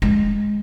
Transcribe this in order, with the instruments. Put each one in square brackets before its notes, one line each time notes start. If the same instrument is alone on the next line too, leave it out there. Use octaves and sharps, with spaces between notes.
[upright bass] G#3